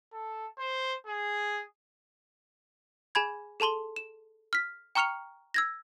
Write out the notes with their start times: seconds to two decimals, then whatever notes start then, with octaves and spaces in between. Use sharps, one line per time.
0.13 A4
0.58 C5
1.07 G#4
3.15 G#4 G#5 B5 G#6
3.60 G#4 A4 A5 C6 G7
3.96 E7
4.53 F6 B6
4.95 G5 A#5 C#6 F6 C#7 F7
5.54 E6 G#6 A#6